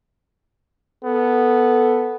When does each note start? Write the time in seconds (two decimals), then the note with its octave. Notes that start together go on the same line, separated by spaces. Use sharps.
1.04 B3 A4